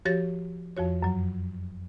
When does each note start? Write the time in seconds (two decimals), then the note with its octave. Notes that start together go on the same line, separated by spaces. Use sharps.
0.05 F3 F#4 G4 C#5 A6 A#6
0.77 F2 F3 F#4 C#5
1.03 F#2 F#3